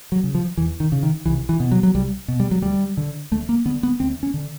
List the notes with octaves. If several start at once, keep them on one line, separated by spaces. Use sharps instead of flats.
F#3
C#3
F3
E2 E3
D#3
C#3
D#3
C2 E3
E3
B2
F#3
F#3
C2 G3
B2
G3
F#3
D2 G3
D3
D2 A3
A#3
D3 B3
B3
D2 C4
C#4
D3